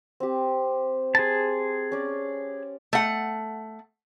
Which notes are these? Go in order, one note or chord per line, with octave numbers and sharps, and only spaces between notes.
C4 G4
G#4 A5 C6 D#6
C#4 D5
A3 F#5